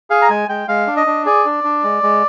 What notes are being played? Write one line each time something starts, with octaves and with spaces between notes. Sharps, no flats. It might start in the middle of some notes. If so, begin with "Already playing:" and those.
G#4 F5
A#5
G#3 G#5
G#3 G5
G#3 F5
D4
D#5
D4
G#4 D5
D4
D4
G#3
G#3